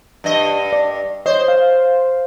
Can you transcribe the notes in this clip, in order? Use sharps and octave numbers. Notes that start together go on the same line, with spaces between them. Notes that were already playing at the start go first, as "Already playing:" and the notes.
G2 D#5
D5
C5 C#5 D#5
F5